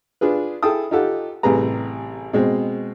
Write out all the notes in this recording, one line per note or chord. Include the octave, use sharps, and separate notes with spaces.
D4 F4 G#4 B4
E4 G#4 A4 G5 A5 D#6
D#4 F4 G4 A4 F#5
A1 C3 G3 G#4 B4 A#5
B2 G#3 C4